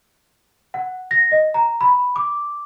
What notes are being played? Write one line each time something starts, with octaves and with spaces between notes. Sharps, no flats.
F#5
A#6
D#5
A#5
B5
D6